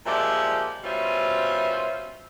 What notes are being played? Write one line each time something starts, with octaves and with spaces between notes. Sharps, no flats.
A#2 F3 G#3 G4 D5 E5
B2 G3 C#4 F4 C5 E5